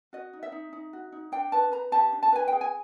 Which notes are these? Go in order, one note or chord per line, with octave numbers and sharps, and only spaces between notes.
F#4 D#5
D#4
E5
D#4
D#4
F#4
D#4
D4 G5
B4 A5
B4 A#5
G4 A5
D4
A5
B4 G#5
G#4 G5
G#5